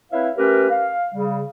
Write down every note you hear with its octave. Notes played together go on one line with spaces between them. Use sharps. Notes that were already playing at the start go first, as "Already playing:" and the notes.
C4 E4 B4 C#5 E5 F5
A3 C#4 G4 A#4 B4
F5
C#3 G3